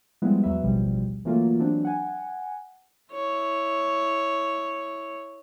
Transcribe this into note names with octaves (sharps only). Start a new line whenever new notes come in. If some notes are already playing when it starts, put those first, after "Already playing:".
F3 G3 G#3 B3 E4 B4
E2 F#3 B4 E5
A1 D2 B2 F3 G3
E3 F#3 A3 A#3 F4
E3 F#3 C4 D4
F#5 G#5
E4 C#5